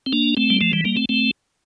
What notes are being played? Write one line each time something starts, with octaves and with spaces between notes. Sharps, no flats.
C4
A#3 D4
A3 C4
G3
F3 A3
E3 G3
G3 A#3
A3 C4
A3 C4